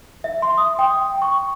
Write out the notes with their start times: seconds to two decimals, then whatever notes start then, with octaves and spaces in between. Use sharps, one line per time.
0.24 E5
0.42 C6
0.58 D#6
0.79 G5
1.22 C#6